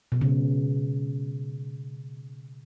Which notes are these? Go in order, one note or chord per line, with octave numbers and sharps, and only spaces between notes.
B2
C#3